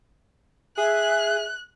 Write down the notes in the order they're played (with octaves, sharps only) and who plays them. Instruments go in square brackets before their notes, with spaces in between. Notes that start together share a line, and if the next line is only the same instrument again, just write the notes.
[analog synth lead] G#4 [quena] E5 [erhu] F#6